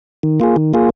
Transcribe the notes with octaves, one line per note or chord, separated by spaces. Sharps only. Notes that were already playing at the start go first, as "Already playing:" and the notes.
D#3
A#3 F4 G#4
D#3
A#3 F4 G#4